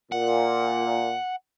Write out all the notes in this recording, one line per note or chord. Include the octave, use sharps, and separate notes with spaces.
A#2 F#5